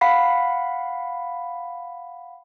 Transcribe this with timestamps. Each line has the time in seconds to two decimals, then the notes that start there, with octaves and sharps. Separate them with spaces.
0.01 F5 F#5 B5 B6 C7